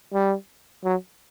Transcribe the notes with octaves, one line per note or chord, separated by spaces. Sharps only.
G3
F#3